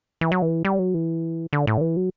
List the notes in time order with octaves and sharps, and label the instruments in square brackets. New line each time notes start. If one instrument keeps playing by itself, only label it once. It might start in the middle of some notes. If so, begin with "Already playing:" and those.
[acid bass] E3
F#3
E3
G3
F#3
E3
D3
A2
D3
E3
F#3